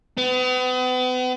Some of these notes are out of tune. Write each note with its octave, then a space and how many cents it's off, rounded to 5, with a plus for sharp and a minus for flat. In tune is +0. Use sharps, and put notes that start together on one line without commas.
B3 +40